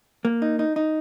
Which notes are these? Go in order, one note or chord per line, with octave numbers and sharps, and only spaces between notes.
A#3
D#4
D#4
D#4